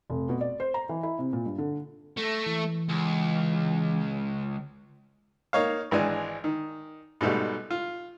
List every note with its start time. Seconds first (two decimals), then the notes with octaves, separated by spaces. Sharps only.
0.10 F1
0.29 B2
0.41 D5
0.60 C5
0.74 A#5
0.89 E3
1.03 E4
1.19 C3
1.33 A#2
1.46 G2
1.58 D3
2.17 A3 A#6
2.46 E3
2.89 C#2
5.53 A#3 D#4 C#5 F5
5.91 G#1 E3 G#3 D4 G#5
6.44 D#3
7.21 G#2 B2 G3 A3
7.71 F4